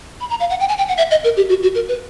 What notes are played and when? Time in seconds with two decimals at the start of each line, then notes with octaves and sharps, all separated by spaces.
0.20 B5
0.30 A#5
0.40 F5
0.50 F#5
0.60 G5
0.69 G#5
0.78 G5
0.88 F#5
0.97 E5
1.11 D#5
1.24 A#4
1.37 G4
1.49 F#4
1.63 F#4
1.75 A#4
1.88 B4